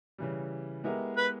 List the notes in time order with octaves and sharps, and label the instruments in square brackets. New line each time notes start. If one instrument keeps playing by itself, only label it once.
[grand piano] C#3 E3 G3
G#3 B3 E4 G4 A#4
[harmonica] B4